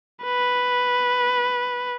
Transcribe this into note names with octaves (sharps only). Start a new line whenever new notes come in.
B4